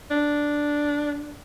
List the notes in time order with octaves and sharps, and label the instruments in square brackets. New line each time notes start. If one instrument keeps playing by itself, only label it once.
[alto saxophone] D4